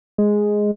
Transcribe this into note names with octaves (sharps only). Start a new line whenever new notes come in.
G#3